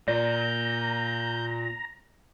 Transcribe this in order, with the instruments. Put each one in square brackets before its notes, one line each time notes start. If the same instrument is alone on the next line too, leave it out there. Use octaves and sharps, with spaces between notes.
[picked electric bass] A#2 [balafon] D5 [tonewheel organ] A#5 [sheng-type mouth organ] G6